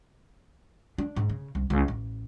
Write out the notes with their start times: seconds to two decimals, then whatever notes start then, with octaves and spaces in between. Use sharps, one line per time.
0.98 D4
1.16 G#2
1.30 C#3
1.55 C2
1.70 C#2
1.88 A1